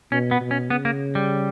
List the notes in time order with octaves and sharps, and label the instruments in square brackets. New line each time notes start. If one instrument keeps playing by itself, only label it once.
[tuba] B2 [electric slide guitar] C#4
[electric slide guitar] B3
[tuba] B2
[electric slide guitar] C#4
[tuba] C#3 [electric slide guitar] B3
[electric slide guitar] A#3
G3